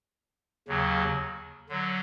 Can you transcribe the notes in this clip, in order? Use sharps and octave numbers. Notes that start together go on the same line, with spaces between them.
D#2 C#3 F#3
D3 F#3